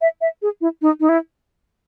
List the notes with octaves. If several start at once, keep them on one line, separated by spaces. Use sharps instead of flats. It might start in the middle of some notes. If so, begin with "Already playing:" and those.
E5
E5
G#4
E4
D#4
D#4
E4